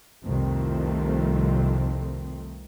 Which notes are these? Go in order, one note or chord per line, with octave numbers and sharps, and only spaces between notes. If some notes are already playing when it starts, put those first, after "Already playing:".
C2 F2 D#3 A3 C4